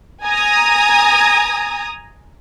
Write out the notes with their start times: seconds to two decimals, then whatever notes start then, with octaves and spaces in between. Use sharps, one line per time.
0.23 G#5 A#5 D#6